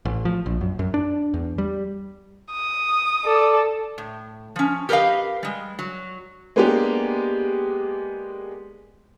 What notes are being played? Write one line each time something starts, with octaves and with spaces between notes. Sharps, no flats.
A1
F3
A#1
F#2
F#2
D4
E2
G3
D#6
A4 D5
A2
F3 C#4
G4 A#4 B4 C#5 D#5 F5
G3 G#3
F#3
G#3 A#3 B3 D4 G4